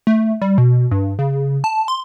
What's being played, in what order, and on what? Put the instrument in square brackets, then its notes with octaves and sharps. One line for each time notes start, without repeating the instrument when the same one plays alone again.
[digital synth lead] A3
G3
B2
G2
C#3
A5
C6